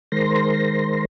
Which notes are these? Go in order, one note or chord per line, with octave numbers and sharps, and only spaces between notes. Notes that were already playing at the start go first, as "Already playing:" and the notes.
D#3 G#3 A#4 C5 C6 A#6